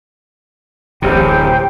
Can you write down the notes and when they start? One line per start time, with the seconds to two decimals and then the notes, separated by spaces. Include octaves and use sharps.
1.02 D1 A1 C3 G4 C5 G5